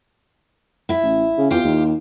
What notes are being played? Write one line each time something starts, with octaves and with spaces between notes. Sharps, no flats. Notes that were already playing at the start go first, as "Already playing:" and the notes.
E4 E5
A1
C#3
E2 F4 G4
D#2